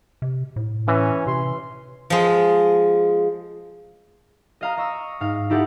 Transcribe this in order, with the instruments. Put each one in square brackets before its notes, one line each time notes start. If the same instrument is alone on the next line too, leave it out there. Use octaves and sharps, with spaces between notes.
[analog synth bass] C3
A2
[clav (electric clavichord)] E3 [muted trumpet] C#4
[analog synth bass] C3 [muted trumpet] C6
[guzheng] F3 G#3
[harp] D#5 F5 A#5
D#5 C#6 E6
G#2 D#4 F5
D#4 E4 G4 A4 F#5